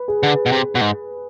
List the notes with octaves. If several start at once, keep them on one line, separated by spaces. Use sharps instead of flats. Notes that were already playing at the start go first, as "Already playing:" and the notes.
Already playing: B4
G#4
D3
B2
C3
B2
G#2